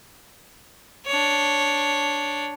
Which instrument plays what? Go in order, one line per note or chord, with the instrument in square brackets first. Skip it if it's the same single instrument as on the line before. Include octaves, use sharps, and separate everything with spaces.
[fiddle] D4 C#5